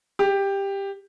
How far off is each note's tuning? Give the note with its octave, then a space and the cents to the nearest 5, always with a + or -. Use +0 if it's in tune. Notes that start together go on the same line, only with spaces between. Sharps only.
G4 +10